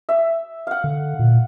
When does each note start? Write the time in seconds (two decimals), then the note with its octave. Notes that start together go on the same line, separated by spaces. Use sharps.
0.09 E5
0.67 F5 F#5
0.84 D3
1.19 A#2